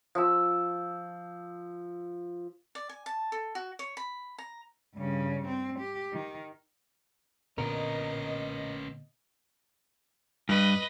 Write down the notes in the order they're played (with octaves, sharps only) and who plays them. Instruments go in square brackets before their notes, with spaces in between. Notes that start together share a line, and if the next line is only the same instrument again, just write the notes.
[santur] F3 E6
[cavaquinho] D5
G#5
A5
A4
F#4
C#5
B5
A#5
[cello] G2 C#3
C4
G4
D#3
[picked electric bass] A#2 D3 B3 [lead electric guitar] C#4 B4 [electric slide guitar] A#4 [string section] D#5
[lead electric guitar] G2 [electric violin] B4 D#5